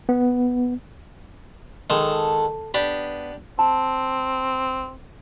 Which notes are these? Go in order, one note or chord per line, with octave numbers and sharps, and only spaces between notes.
B3
D#3 G#3 A4
B3 D4 G4 B5
C4 A5